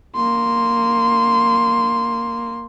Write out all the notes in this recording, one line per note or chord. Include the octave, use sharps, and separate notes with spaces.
A#3 C6